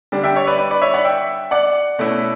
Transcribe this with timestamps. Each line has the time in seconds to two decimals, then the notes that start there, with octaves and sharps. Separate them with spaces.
0.12 D3 G3 D4
0.24 E5 G5
0.36 C#5 E5
0.47 B4 D5
0.58 B4
0.71 B4 D5
0.82 C#5 E5
0.94 D5 F#5
1.05 E5 G5
1.51 D5 F#5
1.99 B2 A3 C#4 E4